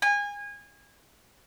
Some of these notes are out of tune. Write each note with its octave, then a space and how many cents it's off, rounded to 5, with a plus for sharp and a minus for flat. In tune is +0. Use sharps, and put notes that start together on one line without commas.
G#5 -25